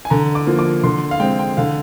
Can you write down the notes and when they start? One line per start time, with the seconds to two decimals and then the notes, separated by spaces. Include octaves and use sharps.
0.05 G#5
0.10 D3 A#5
0.35 D6
0.47 F3 A#3
0.59 D6
0.84 D3 C6
1.11 F5
1.20 G#3 C4 G5
1.39 G5
1.57 D3 F5